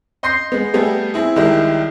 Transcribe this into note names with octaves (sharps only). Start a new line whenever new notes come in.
D#5 C6 G6 A#6 C7
G#3 B3
G3 A3 B3 G4 G#4
C4 E4 G#4
C2 D#3 G#3 E4 G4 A#4